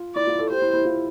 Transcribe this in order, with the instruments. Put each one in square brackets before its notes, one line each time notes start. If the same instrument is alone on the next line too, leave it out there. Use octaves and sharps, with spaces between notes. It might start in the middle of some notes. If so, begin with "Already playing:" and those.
Already playing: [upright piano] F4
[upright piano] E4 [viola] D5
[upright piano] F4
A4
[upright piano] G4 [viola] C5
[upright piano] E4
E4
F4